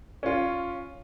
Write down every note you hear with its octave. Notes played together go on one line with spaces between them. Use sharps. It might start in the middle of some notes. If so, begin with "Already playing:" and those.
C#4 F4